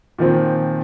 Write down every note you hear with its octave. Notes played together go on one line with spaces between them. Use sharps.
A#2 D#3 F3 C4